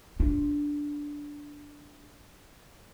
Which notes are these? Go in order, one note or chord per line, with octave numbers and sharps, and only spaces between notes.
D4 F4